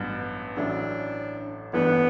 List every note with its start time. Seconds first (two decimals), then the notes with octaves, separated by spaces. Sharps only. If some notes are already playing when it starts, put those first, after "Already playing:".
Already playing: A1 G2 F#3 B3
0.57 A1 A2 F#3 C#4 D4 E4
1.73 A1 G2 E3 A3 B3 D4